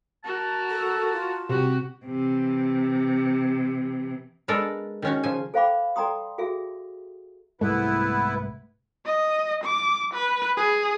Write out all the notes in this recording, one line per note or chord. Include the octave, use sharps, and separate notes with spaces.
F#4 A#4 A5
A4
F4
C3 F#4 G4
C3 E3
G#3 B3 D4 A4 A#4 D5
D#3 C#4 F#4
C#3 F3 G#5
A4 C5 F5 G5 B5 D6
A4 D5 G5 A#5 C6 D#6
F#4 G#4 A4 E5
C2 G#2 A3 B3 E4 B4
D#5
D6
B4
G#4